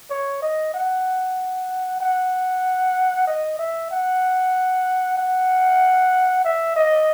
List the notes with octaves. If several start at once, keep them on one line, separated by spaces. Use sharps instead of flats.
C#5
D#5
F#5
F#5
D#5
E5
F#5
F#5
E5
D#5